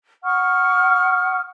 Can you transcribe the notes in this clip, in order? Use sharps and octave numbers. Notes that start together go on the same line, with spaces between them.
F#5 C#6 D#6 F6